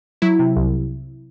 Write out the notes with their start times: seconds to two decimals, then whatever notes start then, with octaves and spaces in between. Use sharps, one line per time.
0.22 F#3 E4
0.39 C3
0.56 C2